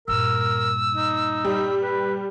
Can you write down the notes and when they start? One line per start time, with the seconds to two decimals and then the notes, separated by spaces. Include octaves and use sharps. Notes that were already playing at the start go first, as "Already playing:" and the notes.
0.08 G2 A#2 A#4 E6
0.96 D#4
1.45 G3
1.83 B4